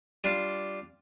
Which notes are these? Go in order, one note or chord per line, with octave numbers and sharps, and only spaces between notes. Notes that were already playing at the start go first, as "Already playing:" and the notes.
G3 D4 F4